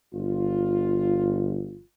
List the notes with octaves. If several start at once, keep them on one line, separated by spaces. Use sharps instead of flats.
G1 F4